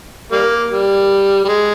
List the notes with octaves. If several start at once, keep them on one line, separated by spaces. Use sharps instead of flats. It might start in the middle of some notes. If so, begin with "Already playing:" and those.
G3 A#3
G3
G3
G#3